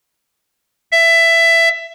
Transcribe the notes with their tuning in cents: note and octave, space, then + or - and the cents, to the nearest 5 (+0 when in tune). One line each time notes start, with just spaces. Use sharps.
E5 +15